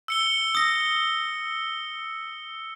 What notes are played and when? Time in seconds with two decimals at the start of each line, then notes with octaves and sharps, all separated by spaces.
0.08 E6 C#7 G7
0.55 D#6 A#6